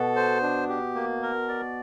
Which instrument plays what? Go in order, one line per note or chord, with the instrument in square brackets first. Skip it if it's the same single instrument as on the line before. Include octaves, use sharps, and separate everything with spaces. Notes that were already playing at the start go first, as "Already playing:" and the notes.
Already playing: [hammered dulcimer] B2 B3 [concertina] A4
[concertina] C5
D4
G4
A#3
A#4
D5